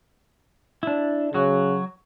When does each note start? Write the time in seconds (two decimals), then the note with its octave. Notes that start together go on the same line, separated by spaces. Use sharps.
0.83 D4 E4
1.34 C#3 F#3 F#4